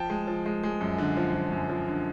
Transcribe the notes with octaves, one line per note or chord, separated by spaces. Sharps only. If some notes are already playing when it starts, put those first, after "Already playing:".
Already playing: F3 G5 A5
G#3
F3
G#3
G#3
F#2
D3
F3
F3
F#2
F3
D3